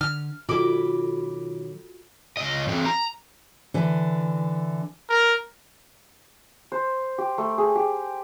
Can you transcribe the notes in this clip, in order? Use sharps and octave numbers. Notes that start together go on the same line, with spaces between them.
D3 F6
B2 D#3 F#3 F4 F#4 A4 B5 D6
C#2 D#5
E3 C4
A#5
D3 E3
A#4
C5
G4
A3
G#4
G4